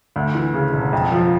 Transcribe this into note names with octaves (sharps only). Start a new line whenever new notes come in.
D2
E3
C#3
E1
F2
F3